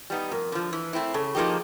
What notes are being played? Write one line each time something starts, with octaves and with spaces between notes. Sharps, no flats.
G3 B3 D#4
F2 A#4
D3 F3
E3
A3 C4 E4
C#3 A4
F3 A#3 D#4 G4 G#4